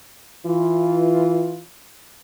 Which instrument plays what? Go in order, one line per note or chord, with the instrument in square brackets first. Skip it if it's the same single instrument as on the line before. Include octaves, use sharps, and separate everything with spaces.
[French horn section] E3 F4